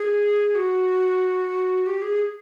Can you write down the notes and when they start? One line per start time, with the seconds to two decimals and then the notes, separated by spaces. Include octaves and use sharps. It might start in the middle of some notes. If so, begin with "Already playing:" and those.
Already playing: G#4
0.55 F#4
1.86 G4
2.02 G#4